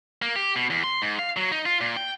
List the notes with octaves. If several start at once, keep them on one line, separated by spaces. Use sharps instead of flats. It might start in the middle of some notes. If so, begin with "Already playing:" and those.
A#3
G4
B2
E2
C6
G#2
F5
F#3
D#4
F4
A#2
G5